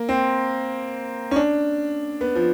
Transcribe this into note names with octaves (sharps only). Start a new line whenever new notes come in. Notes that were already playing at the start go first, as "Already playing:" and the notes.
Already playing: A#3
C4
C#4
D4
B3
F3